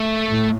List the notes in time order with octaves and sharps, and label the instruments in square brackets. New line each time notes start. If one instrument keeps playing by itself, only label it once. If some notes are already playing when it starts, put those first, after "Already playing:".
Already playing: [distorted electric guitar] A3
[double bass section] A2